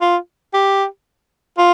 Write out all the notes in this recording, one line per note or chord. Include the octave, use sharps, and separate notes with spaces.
F4
G4
F4